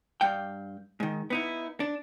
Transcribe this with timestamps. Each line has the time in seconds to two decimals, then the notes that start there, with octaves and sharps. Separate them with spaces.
0.21 G2 F5 G5
1.00 G#2 D#3
1.30 B3 D#4 E4
1.80 D4